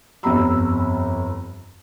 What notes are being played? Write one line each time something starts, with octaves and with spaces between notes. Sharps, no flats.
G1 F2 G3 A#5 B5 E6